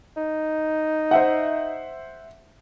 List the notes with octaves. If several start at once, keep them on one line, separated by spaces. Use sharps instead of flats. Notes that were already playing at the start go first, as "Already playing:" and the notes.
D#4
C5 E5 F#5